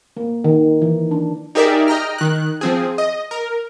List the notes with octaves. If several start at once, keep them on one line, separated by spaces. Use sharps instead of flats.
A#3
D#3
E3
D4
D#4 G4 G#4 A#4 D5 E5
D#5 G5 A#5 F6
D#3 F#6
F3 C4 G#4
D#5
A#4